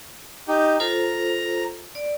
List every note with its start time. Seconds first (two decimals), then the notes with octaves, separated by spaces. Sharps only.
0.48 D#4 G4
0.80 F4 A4 C5 A#5
1.95 D5